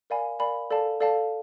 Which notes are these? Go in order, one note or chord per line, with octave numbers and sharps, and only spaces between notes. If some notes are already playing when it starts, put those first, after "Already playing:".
A#4 D5 F5 G#5 B5
A#4 D5 F5 G#5 B5
A4 D5 F5 A5
A4 D5 F5 A5